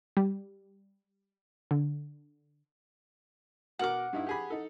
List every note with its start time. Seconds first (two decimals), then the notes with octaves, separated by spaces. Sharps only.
0.17 G3
1.71 D3
3.79 B2 A#4 F#5 D6 F6
4.13 G2 D#4 E4
4.27 G4 G#4 B5
4.50 D#4 A4